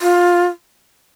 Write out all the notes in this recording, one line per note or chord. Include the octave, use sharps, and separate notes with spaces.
F4